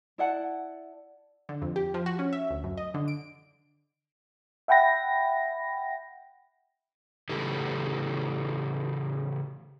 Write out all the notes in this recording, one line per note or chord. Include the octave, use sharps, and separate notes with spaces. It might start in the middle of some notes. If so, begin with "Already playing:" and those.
E4 D5 F#5 A5
D3
F2
G4
F3
F#4
C#4
E5
D2
F#2
D#5
D3
D7
E5 F#5 G5 B5 A#6
A2 C#3 E3 G4 A4